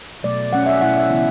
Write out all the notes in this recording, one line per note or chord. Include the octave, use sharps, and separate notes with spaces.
B2 F#3 A3 D5
F#3 A3 C#4 F#5
E5
B2 A3 E4 F#5
E5
C#3 E3 B3 E4